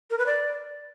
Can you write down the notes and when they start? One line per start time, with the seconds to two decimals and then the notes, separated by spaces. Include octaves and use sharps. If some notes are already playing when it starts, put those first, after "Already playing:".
0.10 A#4
0.18 B4
0.26 D5